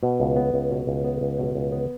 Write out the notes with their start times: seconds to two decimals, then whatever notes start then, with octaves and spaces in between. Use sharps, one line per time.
0.03 B2
0.20 C#2
0.36 B3
0.54 C#2
0.71 B2
0.87 C#2
1.05 B3
1.21 C#2
1.39 B2
1.55 C#2
1.72 B3